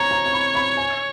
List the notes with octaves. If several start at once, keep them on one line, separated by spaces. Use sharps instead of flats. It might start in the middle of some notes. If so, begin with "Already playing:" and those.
Already playing: C#5 A#5
A#5
C#6
B5
B5
G#5